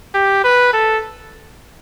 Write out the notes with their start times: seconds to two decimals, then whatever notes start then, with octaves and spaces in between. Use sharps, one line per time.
0.15 G4
0.44 B4
0.73 A4